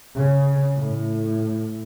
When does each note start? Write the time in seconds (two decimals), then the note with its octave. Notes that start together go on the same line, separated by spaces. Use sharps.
0.14 C#3
0.74 A2